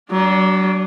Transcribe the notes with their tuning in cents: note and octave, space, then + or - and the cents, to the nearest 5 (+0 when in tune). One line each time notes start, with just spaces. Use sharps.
F#3 +35 D4 -5